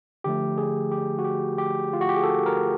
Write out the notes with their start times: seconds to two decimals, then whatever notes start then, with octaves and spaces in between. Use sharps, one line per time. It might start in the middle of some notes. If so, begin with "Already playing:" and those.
0.24 D3 F3 A3 G4
0.58 G#4
0.92 G4
1.19 F#4
1.24 G4
1.58 G4
1.93 F4
2.01 F#4
2.09 G4
2.16 G#4
2.23 A4
2.46 A#4